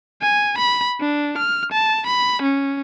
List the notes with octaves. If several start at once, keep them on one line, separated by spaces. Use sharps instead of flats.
G#5
B5
D4
F6
A5
B5
C#4